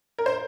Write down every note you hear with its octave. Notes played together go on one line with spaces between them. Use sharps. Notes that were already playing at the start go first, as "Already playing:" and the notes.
A#4
C5